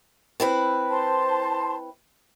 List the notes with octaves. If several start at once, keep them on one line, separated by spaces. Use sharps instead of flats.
C4 E4 B4
C5 A5 C6